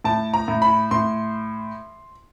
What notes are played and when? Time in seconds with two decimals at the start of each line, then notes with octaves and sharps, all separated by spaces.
0.04 A2 A5
0.34 A#5
0.48 A2
0.62 B5
0.91 A2 C6